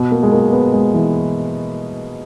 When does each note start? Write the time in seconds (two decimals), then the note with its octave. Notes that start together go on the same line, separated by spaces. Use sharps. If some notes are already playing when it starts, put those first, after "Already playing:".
Already playing: B2
0.12 A#3
0.23 G#3
0.32 A#3
0.53 B3
0.73 G#3
0.94 E3